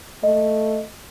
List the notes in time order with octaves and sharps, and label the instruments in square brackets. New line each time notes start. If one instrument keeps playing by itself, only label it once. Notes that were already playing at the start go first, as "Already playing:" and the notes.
[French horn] A3 [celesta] D#5